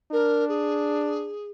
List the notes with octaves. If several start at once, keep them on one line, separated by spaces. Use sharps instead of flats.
D4 A#4
G#4